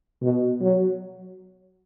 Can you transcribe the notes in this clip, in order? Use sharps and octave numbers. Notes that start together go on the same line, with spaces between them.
B2
F#3